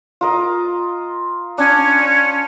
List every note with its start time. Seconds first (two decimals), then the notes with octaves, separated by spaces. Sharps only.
0.21 F4 A#4 D#5
1.58 C#4 D4